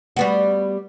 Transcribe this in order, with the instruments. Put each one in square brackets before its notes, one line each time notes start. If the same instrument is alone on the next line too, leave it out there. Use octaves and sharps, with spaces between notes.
[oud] G3 B3 F#4